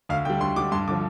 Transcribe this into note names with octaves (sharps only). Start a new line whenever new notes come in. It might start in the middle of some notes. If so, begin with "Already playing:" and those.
D2 F5
D3 G3 G5
D2 C6
D3 G3 D6
G2 C6
D3 F3 D6